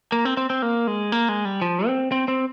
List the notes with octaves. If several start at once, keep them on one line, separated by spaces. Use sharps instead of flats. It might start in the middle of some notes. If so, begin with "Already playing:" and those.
A#3
C4
C4
C4
A#3
G#3
A#3
G#3
G3
F3
C4
C4
C4